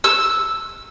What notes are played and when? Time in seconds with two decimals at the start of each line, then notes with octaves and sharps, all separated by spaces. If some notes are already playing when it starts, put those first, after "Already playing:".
0.04 E6